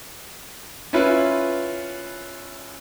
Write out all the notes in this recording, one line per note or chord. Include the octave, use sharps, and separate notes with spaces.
C#4 E4 F4 B4